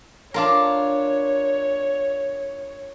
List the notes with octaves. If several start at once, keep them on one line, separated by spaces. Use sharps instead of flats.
D4 F4 A#4 C#5